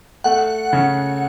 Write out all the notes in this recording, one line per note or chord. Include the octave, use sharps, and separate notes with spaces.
A3 F#5
C#3